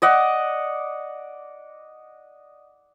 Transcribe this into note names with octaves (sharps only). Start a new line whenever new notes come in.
D5 D#5 F#5